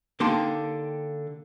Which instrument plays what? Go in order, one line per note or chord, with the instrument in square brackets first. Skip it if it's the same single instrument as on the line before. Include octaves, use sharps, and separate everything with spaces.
[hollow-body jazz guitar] D3 A#3 D#4 G4 A5 C6